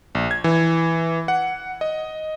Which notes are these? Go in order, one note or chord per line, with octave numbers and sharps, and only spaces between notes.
A#1
G#6
E3
F#5
D#5